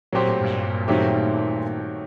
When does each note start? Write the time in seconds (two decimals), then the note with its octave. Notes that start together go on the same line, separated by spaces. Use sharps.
0.13 A#2 F#3 C4 G4 C5
0.27 A2
0.40 G2 A#2
0.87 G2 A#2 D#3 F#3 A3 C4 G4